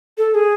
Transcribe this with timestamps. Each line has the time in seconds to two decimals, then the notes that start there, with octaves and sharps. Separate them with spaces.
0.18 A4
0.34 G#4